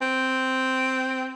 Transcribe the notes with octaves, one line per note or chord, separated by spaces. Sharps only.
C4